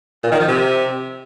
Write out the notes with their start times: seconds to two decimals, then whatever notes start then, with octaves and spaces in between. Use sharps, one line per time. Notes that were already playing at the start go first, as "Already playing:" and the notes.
0.24 A#2
0.32 D#3
0.40 F3
0.48 C3